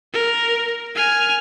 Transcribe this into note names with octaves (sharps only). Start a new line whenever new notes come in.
A#4
G#5 F6